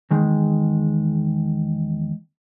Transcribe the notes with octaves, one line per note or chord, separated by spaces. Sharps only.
E2 D#3 G#3